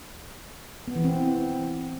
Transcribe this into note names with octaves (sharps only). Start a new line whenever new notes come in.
B3
E3
C4